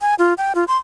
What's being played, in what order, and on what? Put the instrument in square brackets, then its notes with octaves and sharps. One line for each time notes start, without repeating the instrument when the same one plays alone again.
[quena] G#5
F4
G5
F4
C6